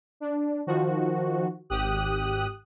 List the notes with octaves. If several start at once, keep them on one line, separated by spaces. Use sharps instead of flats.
D4
D#3 F3 F#4
G#1 G4 D#6 F#6